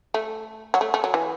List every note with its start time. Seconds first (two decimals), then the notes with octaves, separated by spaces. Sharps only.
0.14 A3
0.74 F#3
0.81 A3
0.94 A3
1.04 F#3
1.14 E3